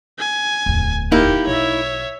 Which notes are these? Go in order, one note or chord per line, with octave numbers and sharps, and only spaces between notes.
G#5
D1 E2
A#3 D#4 E4 G4
B1 C#5 E5